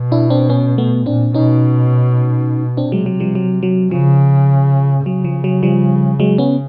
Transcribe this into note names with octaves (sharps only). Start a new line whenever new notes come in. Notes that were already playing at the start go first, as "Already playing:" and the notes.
Already playing: B2
D4 E4
C4 D4
B3 C#4
A3 B3
A#2 C4 D4
B2 C#4 D#4
C3 C4 D4
F#3 G#3
F#3
F3 G3
F#3
F#3
C#3 F3
C#3 F#3
F3
F#3
F3 G3
F#3 G#3
B3 C#4